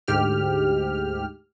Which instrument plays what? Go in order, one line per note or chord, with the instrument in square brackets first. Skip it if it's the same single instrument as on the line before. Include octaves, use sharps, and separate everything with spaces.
[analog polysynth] D2 G#2 G4 F6